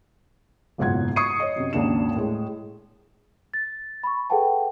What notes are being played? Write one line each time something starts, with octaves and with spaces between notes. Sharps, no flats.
F#1 B1 G#2 F4 F#5 G#6
C#6 D#6 G#6 C7 C#7 D#7
C#5 D#5
F#2 C3
G#1 D#2 C#3 A#3 D4 E7
A2 G#3
A6
B5 C#6
G#4 A4 B4 F#5 G5 A5